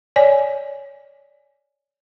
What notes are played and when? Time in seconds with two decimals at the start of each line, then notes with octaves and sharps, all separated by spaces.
0.16 C#5 D5 G#5